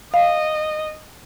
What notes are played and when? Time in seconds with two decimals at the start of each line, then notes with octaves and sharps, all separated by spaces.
0.14 D#5 F5